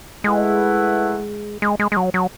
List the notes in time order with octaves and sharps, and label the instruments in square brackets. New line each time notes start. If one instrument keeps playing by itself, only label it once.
[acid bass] G#3 [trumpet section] A3 E4 B4 F#5
[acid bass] G#3
G#3
G#3
F#3
F#3